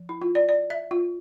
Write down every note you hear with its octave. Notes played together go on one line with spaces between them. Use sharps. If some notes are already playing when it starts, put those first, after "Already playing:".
Already playing: F3
E4
F4
D5
D5
E5
F4